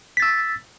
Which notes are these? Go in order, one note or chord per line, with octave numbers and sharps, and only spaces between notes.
E6 A6 B6